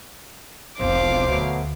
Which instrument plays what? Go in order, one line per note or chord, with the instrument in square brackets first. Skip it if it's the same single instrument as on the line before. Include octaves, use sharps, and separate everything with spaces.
[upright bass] E1 B1 [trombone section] F2 [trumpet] C5 [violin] F5 D6
[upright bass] D2 [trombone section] B2 F#3 A3